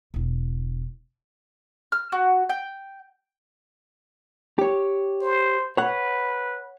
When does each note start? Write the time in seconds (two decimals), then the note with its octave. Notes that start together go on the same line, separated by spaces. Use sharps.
0.14 E1 E4
1.92 F6
2.12 F#4
2.49 G5
4.59 G4 C#5
5.22 C5
5.77 B4 C#5 F#5